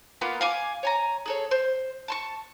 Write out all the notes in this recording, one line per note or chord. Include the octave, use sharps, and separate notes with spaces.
A#3 B3 F4
F5 G#5 D6
C#5 G#5 A#5
G#4 A4 C#5
C5
A5 C6 C#6